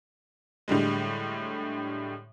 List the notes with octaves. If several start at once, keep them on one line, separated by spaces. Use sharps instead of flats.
A2 D3 G3 G#3